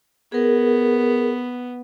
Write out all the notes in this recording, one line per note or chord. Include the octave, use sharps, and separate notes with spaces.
B3 G#4 A#4